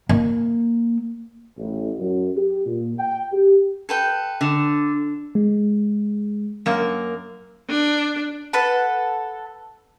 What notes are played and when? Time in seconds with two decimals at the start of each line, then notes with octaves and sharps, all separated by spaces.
0.09 A#3
1.58 A1
1.99 F#2
2.37 G4
2.66 A#2
2.99 G5
3.33 G4
3.89 A4 B4 G5
4.41 D3
5.35 G#3
6.66 F#2 A#3
7.70 D4
8.53 A4 B4 F#5 A5